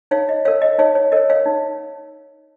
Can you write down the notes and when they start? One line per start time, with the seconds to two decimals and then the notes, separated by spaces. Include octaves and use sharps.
0.11 D#4 C#5 F5
0.29 D#5
0.45 A#4 C#5 F5
0.62 D#5
0.79 D#4 C#5 F5
0.95 C#5
1.12 A#4 C#5 D#5
1.30 C#5 F5
1.46 D#4